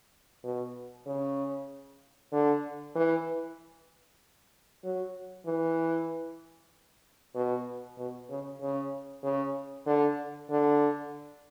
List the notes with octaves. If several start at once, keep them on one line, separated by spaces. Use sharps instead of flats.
B2
C#3
D3
E3
F#3
E3
B2
B2
C#3
C#3
C#3
D3
D3